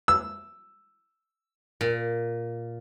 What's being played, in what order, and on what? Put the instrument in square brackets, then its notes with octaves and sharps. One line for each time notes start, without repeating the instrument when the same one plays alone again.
[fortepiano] E6
[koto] A#2